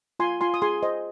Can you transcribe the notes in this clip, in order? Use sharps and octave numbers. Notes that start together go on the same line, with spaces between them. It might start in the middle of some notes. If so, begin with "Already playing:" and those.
F4 G#5 C6
F4 G#5 C6
D#6
G#4 G#5 C6
C5 D#5